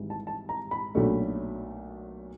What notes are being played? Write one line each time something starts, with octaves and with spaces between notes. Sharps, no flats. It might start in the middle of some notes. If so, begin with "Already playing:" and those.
Already playing: G#1 G#2 E3 G3
A5
A5
A#5
B5
B1 A#2 F#3 A3 D4